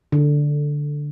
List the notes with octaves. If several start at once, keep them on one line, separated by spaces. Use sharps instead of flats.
D3